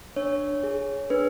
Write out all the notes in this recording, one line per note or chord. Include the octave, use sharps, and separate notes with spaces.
D4 C#5
G#4
D4 B4